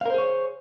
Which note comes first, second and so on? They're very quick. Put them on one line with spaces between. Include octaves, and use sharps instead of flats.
F5 A#4 C5 G#4 C#5